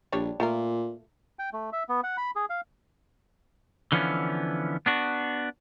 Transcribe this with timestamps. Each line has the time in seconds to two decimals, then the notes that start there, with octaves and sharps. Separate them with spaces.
0.12 A#1 G3 D4 C#5
0.40 A#2 A3 F4 A#4
1.39 G5
1.53 A3
1.73 E5
1.89 B3
2.04 F#5
2.17 B5
2.36 G#4
2.50 F5
3.92 D3 E3 F3 B3 C#4
4.86 B3 D4 F#4